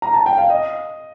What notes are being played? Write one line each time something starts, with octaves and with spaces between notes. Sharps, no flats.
A#5
A5
G5
F5
D#5